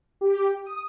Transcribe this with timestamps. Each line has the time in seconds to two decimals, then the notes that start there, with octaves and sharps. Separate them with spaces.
0.21 G4
0.66 D#6